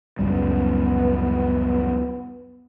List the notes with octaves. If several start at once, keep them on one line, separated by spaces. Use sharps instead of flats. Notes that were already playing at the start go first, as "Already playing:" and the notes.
C#2 F#2 G3 B3